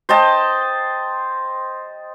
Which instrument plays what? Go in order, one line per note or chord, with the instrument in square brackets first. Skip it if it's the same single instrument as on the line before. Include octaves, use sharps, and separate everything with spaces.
[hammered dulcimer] C5 D#5 G5 A5